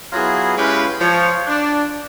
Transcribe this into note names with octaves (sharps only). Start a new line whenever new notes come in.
F#3 B3 E4 F4 G#4
G#3 C#4 E4 G4 B4 F5
F3 C#5
D4